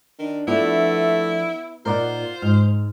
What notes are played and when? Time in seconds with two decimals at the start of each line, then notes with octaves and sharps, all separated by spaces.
0.19 D#3 D4
0.48 F3 A3 B3 D4 E4 D5
1.86 A#2 A#3 D#4 F4 A#4 C5 D5 F#5
2.42 G#2 F6